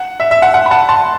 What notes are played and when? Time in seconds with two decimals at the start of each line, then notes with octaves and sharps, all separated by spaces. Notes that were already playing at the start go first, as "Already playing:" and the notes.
Already playing: F#5
0.20 E5
0.31 E5
0.42 F#5
0.54 F#5
0.66 B5
0.71 F#5 A5
0.89 A5 C6